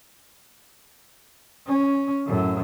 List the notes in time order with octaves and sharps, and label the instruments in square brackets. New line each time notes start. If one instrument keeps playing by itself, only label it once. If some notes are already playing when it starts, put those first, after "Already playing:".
[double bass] C#4
F#2 A2